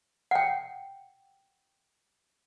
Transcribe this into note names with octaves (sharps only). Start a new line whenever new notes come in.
F#5 G5